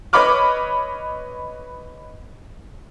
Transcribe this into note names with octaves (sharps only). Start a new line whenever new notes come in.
B4 C#5 D#5 B5 D6 F6